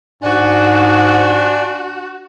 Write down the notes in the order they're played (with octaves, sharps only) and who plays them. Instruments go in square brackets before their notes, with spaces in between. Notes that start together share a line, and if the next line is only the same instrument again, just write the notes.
[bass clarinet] G#2 [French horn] D4 [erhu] F#4 [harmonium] D5 G#5